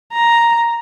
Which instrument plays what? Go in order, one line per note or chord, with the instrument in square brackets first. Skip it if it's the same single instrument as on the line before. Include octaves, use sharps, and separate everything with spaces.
[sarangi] A#5